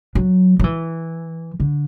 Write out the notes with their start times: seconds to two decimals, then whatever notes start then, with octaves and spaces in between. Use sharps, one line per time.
0.15 F#3
0.59 F#3
0.64 E3
1.60 D3